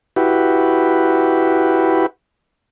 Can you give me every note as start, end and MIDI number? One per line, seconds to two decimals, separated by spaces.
0.16 2.06 64
0.16 2.06 66
0.16 2.06 67
0.16 2.06 71